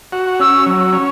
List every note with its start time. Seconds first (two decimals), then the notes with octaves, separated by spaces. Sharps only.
0.12 F#4
0.40 C#4 E6
0.66 F#3
0.93 C#4